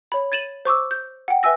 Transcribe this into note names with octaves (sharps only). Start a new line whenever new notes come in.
C#5 B5
G#6 A6 D#7 E7 F#7
C5 C#6 D6 E6
G6
F#5 G5
B4 E5 G#5 E6 A#6